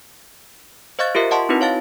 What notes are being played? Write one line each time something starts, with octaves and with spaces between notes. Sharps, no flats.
C5 D#5 F5 C#6 F#6 A6
F4 G4 A#4 E5
D#5 F#5 A5 C6 C#6
C4 D#4 E4 F#4 B4
C#5 F5 A5 A6